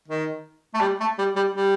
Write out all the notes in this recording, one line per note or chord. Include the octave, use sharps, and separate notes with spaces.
D#3
A3
G3
A3
G3
G3
G3